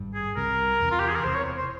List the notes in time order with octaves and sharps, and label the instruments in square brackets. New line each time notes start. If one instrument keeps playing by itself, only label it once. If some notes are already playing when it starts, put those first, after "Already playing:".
Already playing: [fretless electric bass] G#1 G2 G3
[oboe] G#4
[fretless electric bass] C2 C3 G3 [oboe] A#4
[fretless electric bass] E2 C3 E3
[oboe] F4
G4
G#4
A#4
[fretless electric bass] E1 E2 C3 E3 [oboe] C5
[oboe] C#5
C5